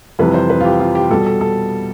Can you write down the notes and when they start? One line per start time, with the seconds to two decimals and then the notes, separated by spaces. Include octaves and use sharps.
0.19 F2 C3 E3 G3 B4
0.34 C5
0.50 B4
0.60 F4
0.65 G4
0.80 F4
0.95 G4
1.10 B2 G3 A4
1.26 A4
1.41 A4